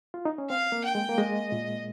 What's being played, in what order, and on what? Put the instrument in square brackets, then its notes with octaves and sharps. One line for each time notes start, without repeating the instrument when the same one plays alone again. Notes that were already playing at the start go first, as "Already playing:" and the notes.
[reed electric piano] F4
D#4
C#4
[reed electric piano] C4 [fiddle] F5
[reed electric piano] A#3
[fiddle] G5
[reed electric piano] G#3
A#3
[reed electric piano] G#3 [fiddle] D#5
[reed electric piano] A#2